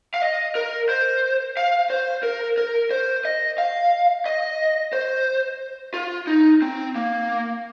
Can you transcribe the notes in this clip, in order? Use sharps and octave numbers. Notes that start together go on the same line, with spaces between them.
F5
D#5
A#4
C5
F5
C5
A#4
A#4
C5
D#5
F5
D#5
C5
F4
D#4
C4
A#3